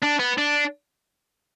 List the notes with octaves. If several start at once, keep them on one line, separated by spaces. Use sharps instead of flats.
D4
B3
D4